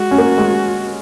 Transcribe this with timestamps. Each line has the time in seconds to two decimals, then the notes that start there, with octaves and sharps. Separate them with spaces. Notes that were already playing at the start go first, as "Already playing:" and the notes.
Already playing: G#3 F#4
0.11 C#4
0.18 A#3
0.38 G#3